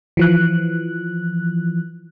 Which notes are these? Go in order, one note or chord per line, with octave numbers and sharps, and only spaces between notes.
E3 F3 F#6